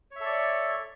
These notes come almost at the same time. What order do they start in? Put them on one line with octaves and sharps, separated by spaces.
C#5 E5 A4 D5